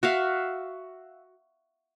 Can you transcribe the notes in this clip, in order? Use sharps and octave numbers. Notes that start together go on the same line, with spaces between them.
F#4 E5 F5